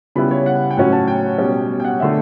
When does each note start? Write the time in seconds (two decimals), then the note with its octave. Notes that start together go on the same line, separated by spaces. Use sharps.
0.15 C#3 G3 B3 E4 B5
0.31 C#5
0.46 F#5
0.71 G5
0.77 A2 F#3 C#4 F#5
0.92 A5
1.08 G5
1.38 B2 G3 C#4
1.80 G5
1.84 F#5
2.00 D3 A3 E5